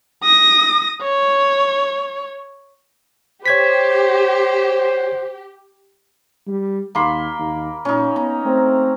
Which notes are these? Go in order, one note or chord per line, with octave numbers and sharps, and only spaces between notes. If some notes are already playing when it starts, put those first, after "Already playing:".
D#6 A#6
C#5
G4 C5 C#5 G#6 B6
G3
D#2 A#3 B5 C6
D#2
A#2 C#4 D#4
B3 A#5
A3 C4